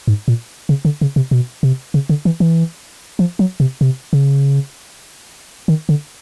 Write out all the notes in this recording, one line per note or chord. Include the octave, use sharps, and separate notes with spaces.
G#2
A#2
C#3
D3
C#3
C3
B2
C3
C#3
D3
E3
E3
F3
F#3
C3
C3
C#3
D#3
D3